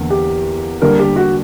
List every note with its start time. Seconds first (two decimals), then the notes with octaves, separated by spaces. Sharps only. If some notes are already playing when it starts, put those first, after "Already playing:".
Already playing: E2 D3 A#3
0.10 G4
0.82 D3 G3 A#3 A#4
0.99 G4
1.16 F#4